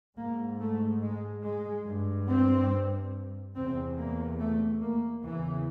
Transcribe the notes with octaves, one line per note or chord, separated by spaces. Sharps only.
G#2 A#3
A3
G#3
G#3
G2
C4
E2 C3 C4
A#3
A3
A#3
E2 C#3 E3